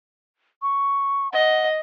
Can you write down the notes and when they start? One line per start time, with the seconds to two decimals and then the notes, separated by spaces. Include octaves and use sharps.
0.62 C#6
1.32 D#5 F#5